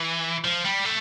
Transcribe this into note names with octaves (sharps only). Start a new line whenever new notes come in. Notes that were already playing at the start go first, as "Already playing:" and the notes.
Already playing: E3
F3
G3
A3